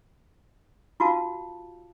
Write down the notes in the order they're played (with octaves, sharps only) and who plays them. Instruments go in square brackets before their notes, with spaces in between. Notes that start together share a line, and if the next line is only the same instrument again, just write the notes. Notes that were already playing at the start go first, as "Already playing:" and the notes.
[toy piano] F4 F#4 F5 A5